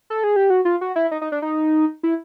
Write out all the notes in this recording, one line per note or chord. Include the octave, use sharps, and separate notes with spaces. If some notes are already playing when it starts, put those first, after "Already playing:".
A4
G#4
G4
F#4
F4
F#4
E4
D#4
D#4
D4
D#4
E4